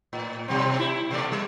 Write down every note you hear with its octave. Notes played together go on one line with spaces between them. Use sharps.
A2
B2 G3 C4
E4
B2 A3 D5
G3